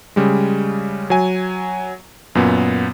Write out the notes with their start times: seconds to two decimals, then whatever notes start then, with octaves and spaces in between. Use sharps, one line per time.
0.16 C#3 G3 G#3
1.10 F#3 G#5
2.35 F#2 A#2 B3